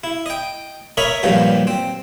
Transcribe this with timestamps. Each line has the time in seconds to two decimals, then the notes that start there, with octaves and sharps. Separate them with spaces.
0.04 E4
0.26 D#5 G5
0.97 A#4 C#5 D#5 E5 A#5 B5
1.23 G2 A#2 D#3 F3 F#3
1.67 C4